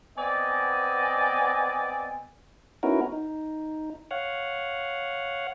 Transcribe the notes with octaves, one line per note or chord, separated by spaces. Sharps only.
B3 C4 D5 D#5 G#5
B3 C#4 D#4 E4 F#4 A#4
D#4
C#5 F5 F#5